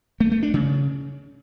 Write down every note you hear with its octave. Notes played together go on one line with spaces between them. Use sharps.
A3
A3
D4
C#3